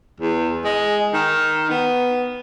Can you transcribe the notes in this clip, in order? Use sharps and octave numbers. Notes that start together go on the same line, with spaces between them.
E2
G#3
D#3
B3